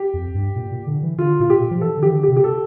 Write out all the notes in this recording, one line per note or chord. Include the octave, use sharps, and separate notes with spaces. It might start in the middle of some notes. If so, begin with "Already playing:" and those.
Already playing: G4
F2
G2
A#2
A#2
D3
E3
D3 F4
A#2 F4
G4
A#2
F3
E3 A4
D3
E3 G4
D3
G4
C3
G4
A4